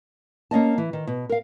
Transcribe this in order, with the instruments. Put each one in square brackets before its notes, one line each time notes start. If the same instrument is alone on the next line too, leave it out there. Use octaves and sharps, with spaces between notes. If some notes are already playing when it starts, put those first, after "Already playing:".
[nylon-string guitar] A#3 C#4 D#5 A5
E3
D#3
B2
A#4 F5